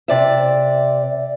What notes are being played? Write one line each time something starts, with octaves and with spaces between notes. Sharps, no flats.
C3 D5 E5